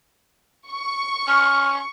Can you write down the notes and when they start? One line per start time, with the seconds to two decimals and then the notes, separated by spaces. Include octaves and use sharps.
0.69 C#6
1.28 C#4 F6